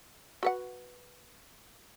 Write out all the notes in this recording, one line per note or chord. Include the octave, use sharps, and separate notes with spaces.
F#4 B4 F#5